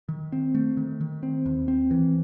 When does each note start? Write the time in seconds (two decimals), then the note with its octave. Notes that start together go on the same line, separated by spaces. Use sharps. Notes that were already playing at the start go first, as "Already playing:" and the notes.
0.09 D#3
0.32 C4
0.55 A3
0.77 D#3
1.01 D#3
1.23 C4
1.46 D#2
1.68 C4
1.91 E3